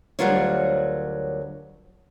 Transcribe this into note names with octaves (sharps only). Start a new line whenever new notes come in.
D2 F#3 G3 F4 A#4 C#5